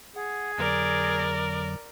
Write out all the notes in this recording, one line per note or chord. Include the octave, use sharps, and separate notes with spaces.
G#4 F#5
F2 D3 F#3 A#4 D5